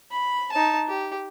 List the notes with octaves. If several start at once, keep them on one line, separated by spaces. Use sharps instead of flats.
B5
D#4 A5
G4